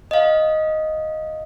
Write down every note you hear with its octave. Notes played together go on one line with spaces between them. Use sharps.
D#5 F5